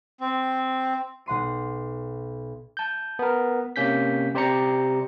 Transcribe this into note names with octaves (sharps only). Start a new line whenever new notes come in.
C4
B1 F#5 C6 D#7
A5 G6
B3 A#4
C3 A#3 C#4 G6 B6
C3 G4 C5 D5 A#5 C#7